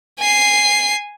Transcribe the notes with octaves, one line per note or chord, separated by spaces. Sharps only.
G#5 C7